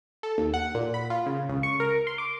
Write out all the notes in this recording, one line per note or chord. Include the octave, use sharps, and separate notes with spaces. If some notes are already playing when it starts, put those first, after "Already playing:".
A4
D#2
F#5
A#2
B5
F4
C#3
C#2
C#6
A#4
C6
D6